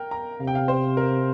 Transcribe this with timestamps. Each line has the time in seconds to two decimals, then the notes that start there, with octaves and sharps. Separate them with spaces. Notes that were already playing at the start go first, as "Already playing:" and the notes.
Already playing: A#4 G5
0.11 A#5
0.40 C3 F5
0.47 G5
0.55 F5
0.68 C5
0.97 A#4